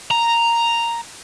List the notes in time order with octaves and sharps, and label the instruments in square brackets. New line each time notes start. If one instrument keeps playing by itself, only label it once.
[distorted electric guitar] A#5